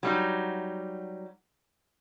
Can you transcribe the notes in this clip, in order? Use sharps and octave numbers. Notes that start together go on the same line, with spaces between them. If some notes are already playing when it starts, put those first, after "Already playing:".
F#3 G3 D#4